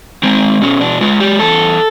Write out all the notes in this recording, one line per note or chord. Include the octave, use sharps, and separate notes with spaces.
G#3 C4
B2 C#4
D4
G#3 F4
G4
E2 A4